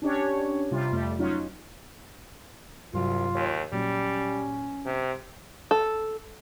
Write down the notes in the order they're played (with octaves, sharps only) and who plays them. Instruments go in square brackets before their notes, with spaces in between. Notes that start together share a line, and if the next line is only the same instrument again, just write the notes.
[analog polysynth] C#4 D4 G4 C#5
C3 G3 F4
F2 G3 A3
F#3 C#4 D#4 F4
[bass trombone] C2 [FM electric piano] G2 C3 F#3 [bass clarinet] F4
[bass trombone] D#2 [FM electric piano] C#5
[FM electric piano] A#2 F#3 [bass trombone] G3 [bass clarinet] C#4
[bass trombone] C3
[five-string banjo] A4